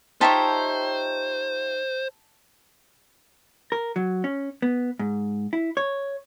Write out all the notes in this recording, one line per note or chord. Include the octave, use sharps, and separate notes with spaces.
D#4 F4 G4 C5 C#5 E5 A5
A#4
F#3
C#4
B3
G#2
E4
C#5